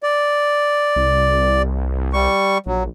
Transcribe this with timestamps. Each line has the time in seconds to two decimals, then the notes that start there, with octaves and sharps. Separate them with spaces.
0.03 D5
0.96 C2
2.13 G3 C#6
2.66 A#1 F#3